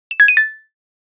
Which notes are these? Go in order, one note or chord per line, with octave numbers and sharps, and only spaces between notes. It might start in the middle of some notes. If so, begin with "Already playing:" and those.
E7
G#6
D#7
A6